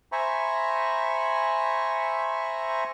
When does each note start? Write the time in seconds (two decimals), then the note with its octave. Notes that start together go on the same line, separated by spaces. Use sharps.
0.12 C5 E5 G#5 A#5 B5 C#6